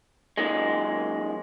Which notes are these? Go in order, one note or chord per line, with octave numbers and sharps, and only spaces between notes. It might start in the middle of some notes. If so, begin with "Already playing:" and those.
F#2 A#2 D#3 G#3